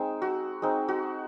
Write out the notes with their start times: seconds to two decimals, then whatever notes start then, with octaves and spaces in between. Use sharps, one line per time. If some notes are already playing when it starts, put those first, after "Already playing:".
Already playing: G#3 C4 D#4
0.22 F#4
0.62 G#3 C4 D#4
0.88 F#4